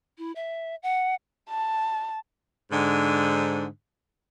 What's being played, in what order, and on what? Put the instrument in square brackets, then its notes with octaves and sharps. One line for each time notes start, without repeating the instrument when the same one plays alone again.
[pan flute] E4
E5
F#5
[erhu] A5
[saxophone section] G#2 D3